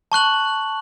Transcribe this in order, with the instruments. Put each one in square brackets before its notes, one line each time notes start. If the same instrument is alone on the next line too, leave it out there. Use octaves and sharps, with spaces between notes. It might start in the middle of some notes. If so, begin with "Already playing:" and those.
[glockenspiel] A5 C#6 F#6 F#7